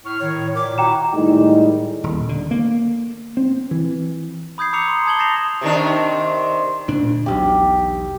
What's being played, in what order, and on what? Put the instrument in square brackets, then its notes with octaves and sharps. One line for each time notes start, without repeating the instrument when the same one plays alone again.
[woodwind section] A2 C#6 F6
[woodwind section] A2 D#3 [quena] C#5
[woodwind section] A#2 [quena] D6
[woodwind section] E4 F#4 [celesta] G5 A#5 E7
[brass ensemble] A2 D#3 G3 G#3 D#4
[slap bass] D#1
D3
A#3
C4
E3
[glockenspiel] B5 D#6 G6 G#6 C7
A#5 D6 E6 C7 C#7 F7
C6
A5 D#6 G#6 F#7 G7
G6 A6 A#6 C7 E7 F7
[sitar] C3 D#3 D4
[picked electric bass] D2 A#2 D4
[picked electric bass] E1 B1 [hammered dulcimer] G4